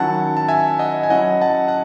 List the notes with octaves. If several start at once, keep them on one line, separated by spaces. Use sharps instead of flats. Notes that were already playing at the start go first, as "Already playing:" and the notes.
Already playing: D#3 F#3 C#4 E4 F#5 A5
A5
E5 G#5
D#5 F#5
G#5
F#3 C#4 E4 D#5 F#5
F#5 A5
F#5